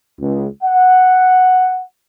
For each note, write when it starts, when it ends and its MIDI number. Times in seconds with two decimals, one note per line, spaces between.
0.19 0.46 37
0.63 1.82 78